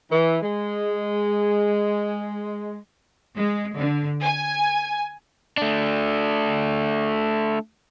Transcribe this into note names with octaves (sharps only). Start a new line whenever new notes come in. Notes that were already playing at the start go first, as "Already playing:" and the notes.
E3
G#3
G#3
D3
G#5
A3 D4